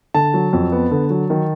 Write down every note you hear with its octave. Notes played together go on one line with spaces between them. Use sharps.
D3 A5
F#3
F2
B3
D3
F#3
D#3